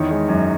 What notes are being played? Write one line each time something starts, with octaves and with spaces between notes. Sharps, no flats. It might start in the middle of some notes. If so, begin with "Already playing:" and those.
Already playing: E2 D#3 C#5
G#3
F#2